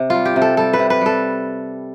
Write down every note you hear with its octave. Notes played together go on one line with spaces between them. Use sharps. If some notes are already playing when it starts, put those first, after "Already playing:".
Already playing: C3
G3 F4
G4
C3
A4
G3 A4
B4
C3
B4
G3 A4